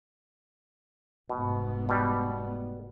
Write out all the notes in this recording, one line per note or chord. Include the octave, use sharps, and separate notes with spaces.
F1 G#2 B2 B3
B2 G3